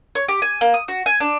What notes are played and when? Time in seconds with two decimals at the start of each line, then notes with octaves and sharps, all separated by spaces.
0.15 C#5
0.28 G4
0.42 G#5
0.61 A#3
0.74 D#6
0.88 F#4
1.06 G#5
1.20 D4